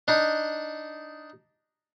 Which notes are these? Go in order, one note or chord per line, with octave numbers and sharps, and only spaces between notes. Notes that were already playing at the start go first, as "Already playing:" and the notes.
D4 D#4